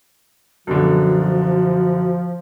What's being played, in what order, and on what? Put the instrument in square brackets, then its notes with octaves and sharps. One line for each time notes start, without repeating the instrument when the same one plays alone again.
[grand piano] F#2 B2 D3 [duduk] F3 [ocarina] F#4